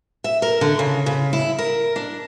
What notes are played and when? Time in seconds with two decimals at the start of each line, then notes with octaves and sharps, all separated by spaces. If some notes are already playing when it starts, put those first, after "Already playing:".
0.24 E5
0.42 A#4
0.61 D3
0.79 C#3
1.06 C#3
1.33 E4
1.59 A#4
1.96 D4